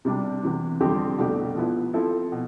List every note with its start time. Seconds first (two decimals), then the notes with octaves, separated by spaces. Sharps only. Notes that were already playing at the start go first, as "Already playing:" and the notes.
0.05 C3 G3 D4 G4
0.43 E2 C3 E3
0.80 F2 D3 G3 C4 G4
1.18 C2 B2 A3 D4 G4
1.56 F3 B3 E4
1.93 F3 C4 E4 A4
2.32 B2